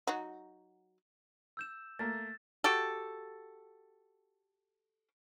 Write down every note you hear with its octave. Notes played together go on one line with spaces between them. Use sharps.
F#3 D#4 F#4
E6 G6 E7
A3 A#3 A6
F#4 G4 A4